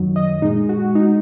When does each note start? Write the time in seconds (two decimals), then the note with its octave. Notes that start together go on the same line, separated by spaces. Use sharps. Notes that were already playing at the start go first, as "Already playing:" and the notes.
Already playing: F#2 D#3 F#3
0.16 D#5
0.42 A#2 G#3 D#4
0.69 F#4
0.95 G#3 D#4